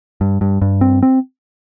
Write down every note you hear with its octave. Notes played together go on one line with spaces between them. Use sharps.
G2
G2
G2
C4
C4